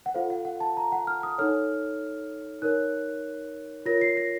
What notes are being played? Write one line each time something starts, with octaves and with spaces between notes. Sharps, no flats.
F#5
F4 A4 C5 F5
F#5
F#5
A5
A#5
F#5
F6
D#6
D#4 A4 C#5 F6
D#4 A#4 C#5 F#6
F4 A#4 C#5 A#6
C7
A#6